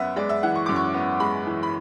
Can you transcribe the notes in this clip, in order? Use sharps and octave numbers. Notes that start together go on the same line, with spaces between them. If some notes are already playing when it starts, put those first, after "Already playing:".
Already playing: F#2 B3 E5 F#5
G#3 D5
E5
E3 F#5
C#6
F#2 D6
C#6
B3
G#3 B5
E3
B5